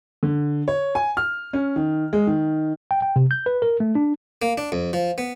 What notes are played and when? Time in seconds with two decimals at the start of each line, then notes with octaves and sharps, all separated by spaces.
0.23 D3
0.68 C#5
0.95 G#5
1.17 F6
1.53 C#4
1.76 D#3
2.13 G#3
2.27 D#3
2.91 G5
3.02 G5
3.16 C3
3.31 G6
3.46 B4
3.62 A#4
3.80 A3
3.95 D4
4.42 A#3
4.58 D4
4.72 F2
4.93 F3
5.18 B3